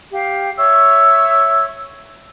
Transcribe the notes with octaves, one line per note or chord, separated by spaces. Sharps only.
G4 F5
C#5 E5 C#6 E6